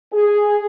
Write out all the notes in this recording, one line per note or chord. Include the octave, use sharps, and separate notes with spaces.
G#4